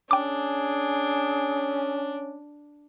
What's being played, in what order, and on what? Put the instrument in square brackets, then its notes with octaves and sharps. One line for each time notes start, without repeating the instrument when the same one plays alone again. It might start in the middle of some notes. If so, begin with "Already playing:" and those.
[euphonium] C#4 [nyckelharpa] D4 [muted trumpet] G#4 [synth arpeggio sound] G5 D6